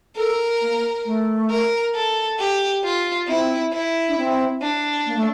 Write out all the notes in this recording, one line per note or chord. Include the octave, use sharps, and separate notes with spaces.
A4 A#4
A#3
A3
A#4
A4
G4
F4
C4 E4
E4
D4
C4
D4
A#3
A3